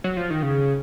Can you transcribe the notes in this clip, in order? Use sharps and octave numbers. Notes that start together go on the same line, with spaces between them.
F#3
F3
D#3
C#3